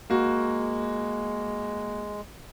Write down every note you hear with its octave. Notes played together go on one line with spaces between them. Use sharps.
G#3 A#3 F#4